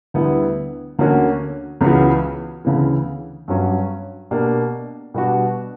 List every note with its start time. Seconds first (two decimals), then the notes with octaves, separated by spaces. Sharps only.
0.14 D2 D3 G3 B3 E4
0.99 D2 D3 A#3 C#4 F#4
1.81 C#2 C#3 E3 B3 F#4
2.65 D2 C#3 E3
3.48 G2 F#3 C#4 F#4
4.31 B2 A#3 D4 G4
5.14 B2 G3 B3 D4 F#4